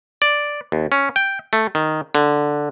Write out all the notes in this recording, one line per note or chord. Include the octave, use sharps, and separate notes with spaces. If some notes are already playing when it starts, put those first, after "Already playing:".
D5
D#2
C#4
G5
A3
D#3
D3